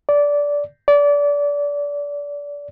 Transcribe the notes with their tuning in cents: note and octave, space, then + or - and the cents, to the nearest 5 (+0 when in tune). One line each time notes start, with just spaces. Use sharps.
D5 -15
D5 -25